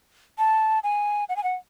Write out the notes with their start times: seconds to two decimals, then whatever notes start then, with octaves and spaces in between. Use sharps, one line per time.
0.38 A5
0.83 G#5
1.29 F#5
1.36 G#5
1.43 F#5